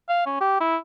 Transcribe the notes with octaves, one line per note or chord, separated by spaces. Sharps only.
F5
C#4
G4
E4